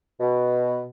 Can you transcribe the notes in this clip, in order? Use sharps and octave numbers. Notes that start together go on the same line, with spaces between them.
B2